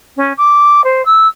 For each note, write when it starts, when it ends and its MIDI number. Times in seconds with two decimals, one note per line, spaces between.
0.16 0.33 61
0.37 0.83 86
0.84 1.04 72
1.05 1.26 88